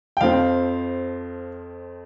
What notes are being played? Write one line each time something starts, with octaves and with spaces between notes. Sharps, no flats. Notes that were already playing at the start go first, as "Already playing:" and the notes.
G5
F2 F3 C4 F5